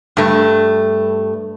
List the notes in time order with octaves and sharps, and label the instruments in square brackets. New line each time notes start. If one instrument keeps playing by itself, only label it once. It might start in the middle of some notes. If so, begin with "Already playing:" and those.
[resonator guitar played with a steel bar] G2 A3